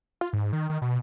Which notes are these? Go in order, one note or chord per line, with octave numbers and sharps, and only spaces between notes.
F4
G#2
D#3
D#3
B2